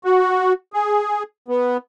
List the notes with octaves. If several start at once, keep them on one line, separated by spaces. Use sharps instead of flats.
F#4
G#4
B3